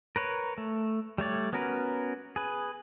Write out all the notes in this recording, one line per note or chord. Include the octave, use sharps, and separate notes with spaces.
A#4 B4 C#5
A3
G3 A3 C#5 D5
B3 C#4 F#4 A#4 B4
G#4 B4